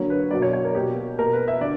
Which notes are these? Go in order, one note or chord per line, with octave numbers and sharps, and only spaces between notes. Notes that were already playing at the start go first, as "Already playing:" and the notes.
Already playing: D3 F#3 A#3 C#5
B4
B2 F#3 A#3 D5
C#5
C#5
A#4
B2 A#3 G4
B2 A#3 A#4
B4
E5
D3 D5